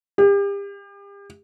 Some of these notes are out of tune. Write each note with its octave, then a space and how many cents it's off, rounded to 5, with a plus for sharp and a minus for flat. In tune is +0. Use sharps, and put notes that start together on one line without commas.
G4 +35